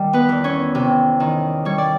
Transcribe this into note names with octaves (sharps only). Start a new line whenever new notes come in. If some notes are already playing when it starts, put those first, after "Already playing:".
Already playing: D#3 G3
B3 B4
E2
C#4 C#5
C3
D#3
G3 C#5
D5